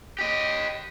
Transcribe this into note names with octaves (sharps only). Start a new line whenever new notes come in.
G4 D#5